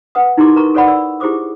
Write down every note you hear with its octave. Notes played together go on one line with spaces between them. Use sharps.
B4 F#5 D#6
D#4 E4 G4 A#4 C6 D6
A#4 B4 A#5 C#6
A4 B4 C#5 D5 F#5 B5
D5 E6
E4 G4 G#4 C5 D6 D#6